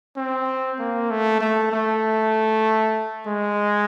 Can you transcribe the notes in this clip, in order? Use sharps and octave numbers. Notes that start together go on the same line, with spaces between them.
C4
A#3
A3
A3
A3
G#3